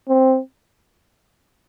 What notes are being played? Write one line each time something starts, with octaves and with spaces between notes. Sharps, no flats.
C4